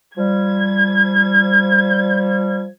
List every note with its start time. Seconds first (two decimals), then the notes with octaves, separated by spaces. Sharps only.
0.18 F3 G3 G#6